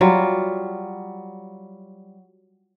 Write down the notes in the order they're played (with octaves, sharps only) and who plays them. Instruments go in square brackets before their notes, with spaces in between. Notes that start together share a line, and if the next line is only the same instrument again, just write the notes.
[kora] F#3 G3 F4